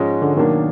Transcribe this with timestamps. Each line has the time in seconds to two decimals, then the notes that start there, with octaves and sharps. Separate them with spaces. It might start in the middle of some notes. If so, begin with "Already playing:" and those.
Already playing: G#2 F3 G#3 C#4
0.22 D3
0.36 B2 D#3 F#3 A#3 D4